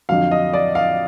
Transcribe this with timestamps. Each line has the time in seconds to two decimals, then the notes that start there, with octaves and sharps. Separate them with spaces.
0.09 F2 D3 F#3 F5
0.31 D#5
0.53 D5
0.75 F5